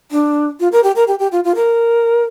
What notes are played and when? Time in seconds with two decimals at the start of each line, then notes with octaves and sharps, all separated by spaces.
0.11 D4
0.60 F4
0.72 A#4
0.83 G4
0.96 A#4
1.07 G4
1.19 G4
1.32 F4
1.44 F4
1.55 A#4